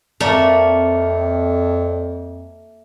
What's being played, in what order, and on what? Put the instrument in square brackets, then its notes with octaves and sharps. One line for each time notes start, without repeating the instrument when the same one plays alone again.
[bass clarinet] F2 [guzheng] A3 A#3 E5 [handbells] C4 D5 C#7